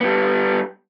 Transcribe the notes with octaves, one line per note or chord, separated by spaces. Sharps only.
G3 B3